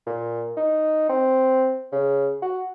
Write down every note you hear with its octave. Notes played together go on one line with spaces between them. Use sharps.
A#2
D#4
C4
C#3
F#4